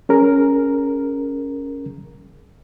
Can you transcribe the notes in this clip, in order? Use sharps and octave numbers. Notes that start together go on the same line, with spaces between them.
C#4 G#4 A#4